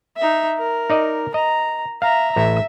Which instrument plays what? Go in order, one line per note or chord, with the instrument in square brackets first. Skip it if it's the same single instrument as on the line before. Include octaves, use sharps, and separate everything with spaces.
[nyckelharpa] D#4 E5
A#4
[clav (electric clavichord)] D#4 D5 D#5
[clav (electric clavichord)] D#5 [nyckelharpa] A#5
[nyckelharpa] E5 A#5 [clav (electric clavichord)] F5
[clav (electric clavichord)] A1 A2 [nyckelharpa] E5